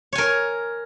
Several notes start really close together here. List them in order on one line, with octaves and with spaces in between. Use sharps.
C#5 G#5 A#4